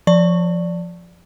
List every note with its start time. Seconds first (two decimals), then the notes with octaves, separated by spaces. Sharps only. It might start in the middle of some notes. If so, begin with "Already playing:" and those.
0.07 F3 D5 C#6